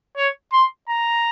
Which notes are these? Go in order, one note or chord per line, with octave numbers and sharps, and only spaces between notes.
C#5
C6
A#5